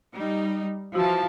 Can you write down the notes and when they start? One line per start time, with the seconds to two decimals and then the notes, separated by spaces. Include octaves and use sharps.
0.15 G3 D#4
0.95 E3 F3 F4 F#4 A5